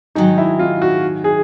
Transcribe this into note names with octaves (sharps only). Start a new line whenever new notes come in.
G#2 D#3 F#3 D#4
E4
F4
F#4
G#4